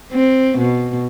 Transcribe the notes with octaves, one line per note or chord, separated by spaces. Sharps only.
C4
B2